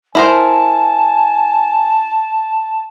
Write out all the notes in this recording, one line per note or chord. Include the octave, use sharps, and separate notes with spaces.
E4 A#4 C5 G#5 A5